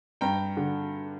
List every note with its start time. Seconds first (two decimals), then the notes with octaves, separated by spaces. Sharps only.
0.21 G2 G5 A#5
0.57 D3